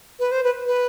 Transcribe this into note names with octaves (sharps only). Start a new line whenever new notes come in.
B4
C5
B4
B4